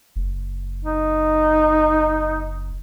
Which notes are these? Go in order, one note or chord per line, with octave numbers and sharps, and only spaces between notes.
F#1
D#4